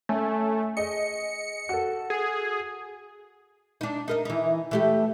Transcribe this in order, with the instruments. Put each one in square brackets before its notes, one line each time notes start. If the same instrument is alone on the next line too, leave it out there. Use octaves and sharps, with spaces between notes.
[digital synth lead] A3 [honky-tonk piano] C#4 G#5
[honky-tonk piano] G#4 D#5 [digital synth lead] C#7
[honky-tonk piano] F#4 A4
[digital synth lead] G#4
[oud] D4 D#4
D#4 A#4 D#5
E3 D#4
E3 A3 G4